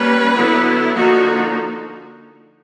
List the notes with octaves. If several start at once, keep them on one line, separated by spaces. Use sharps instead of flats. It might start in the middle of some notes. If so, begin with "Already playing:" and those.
Already playing: G3 A#3 C#4 B4
D3 F#3 B3 E4
D3 F3 A#3 D#4 F#4